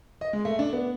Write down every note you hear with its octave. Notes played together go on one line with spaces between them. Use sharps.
D#5
G#3
A3
D4
B3